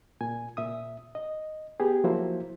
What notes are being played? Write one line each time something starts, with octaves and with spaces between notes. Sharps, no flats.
A#2 G#5
A#2 E5 D#6
D#5
B3 G4 G#4
F3 F#3 A#3 E4 F#4 C5